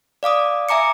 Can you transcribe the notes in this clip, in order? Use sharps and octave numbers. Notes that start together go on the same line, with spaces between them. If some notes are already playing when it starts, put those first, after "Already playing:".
D5 F5 D6 D#6
E5 G#5 A#5 D6 C#7